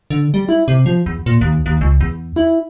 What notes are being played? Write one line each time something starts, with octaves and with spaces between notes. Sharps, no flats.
D3
G3
E4
C3
F3
E2
A#2
D#2
D#2
C#2
E2
E4